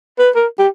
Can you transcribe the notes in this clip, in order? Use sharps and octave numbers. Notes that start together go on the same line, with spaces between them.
B4
A#4
G4